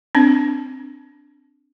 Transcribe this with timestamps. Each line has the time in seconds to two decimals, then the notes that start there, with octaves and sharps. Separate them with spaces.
0.15 C4 D4